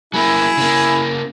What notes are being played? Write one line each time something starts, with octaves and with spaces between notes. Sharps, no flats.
F#3 A#3 E4 G#4
C#3 A#3